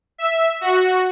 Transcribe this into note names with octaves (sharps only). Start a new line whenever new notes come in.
E5
F#4